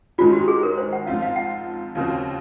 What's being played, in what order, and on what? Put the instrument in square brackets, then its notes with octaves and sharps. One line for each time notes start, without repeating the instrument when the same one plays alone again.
[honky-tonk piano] G#2 D#3 G#3 C#4 [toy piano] F4
[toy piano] F#4
G#4
A#4
C5
F#5
[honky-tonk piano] G#2 F3 C4 F4 [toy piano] F5
[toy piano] F5
F#5
[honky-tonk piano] D#2 C#3 F3 C4 F#4